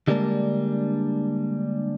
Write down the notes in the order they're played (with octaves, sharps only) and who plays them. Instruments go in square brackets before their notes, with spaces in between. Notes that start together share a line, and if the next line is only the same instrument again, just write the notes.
[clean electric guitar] D3 G3 G#3 A#3 D4